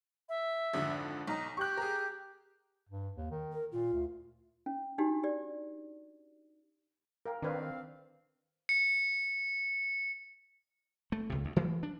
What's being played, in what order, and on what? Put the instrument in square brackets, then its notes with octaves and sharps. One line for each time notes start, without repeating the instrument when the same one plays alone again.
[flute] E5
[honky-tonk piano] G#1 F2 D3
[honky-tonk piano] B1 [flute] D#4
[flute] G4 [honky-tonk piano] C#6 F#6
[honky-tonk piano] G#4 A#4
[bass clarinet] G2
D#2
D#3
[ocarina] A#4
[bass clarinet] A#2 [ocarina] F4
[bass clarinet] D2
[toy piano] C#4
D4 D#4 F#4 G4
G4 D5
[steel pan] A#4 F5 G5
[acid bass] D#3 [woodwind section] C4 F5 [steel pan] D4 B4 D5
[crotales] C#7
[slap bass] A3
C#2 C3
D2
E3 F#3 A3
D4